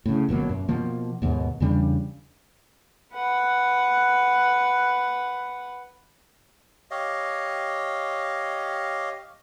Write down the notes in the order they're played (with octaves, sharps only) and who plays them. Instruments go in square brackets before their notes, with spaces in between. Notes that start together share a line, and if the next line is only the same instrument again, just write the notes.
[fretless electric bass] A2 C#3
G1 B2 F#3 A#3
F#2
B2 F3 A#3
D#2 G#2 B2
E2 C#3 G3 D4
[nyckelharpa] B4 F#5
[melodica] G4 C#5 D#5 F5